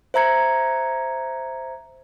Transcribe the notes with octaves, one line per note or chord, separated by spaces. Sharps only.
C5 E5 A#5 G#6 C#7